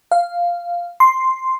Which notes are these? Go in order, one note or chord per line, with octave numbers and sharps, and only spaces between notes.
F5
C6